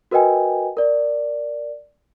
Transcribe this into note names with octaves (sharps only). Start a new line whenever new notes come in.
F#4 A#4 B4 D#5 G5 G#5
A#4 D5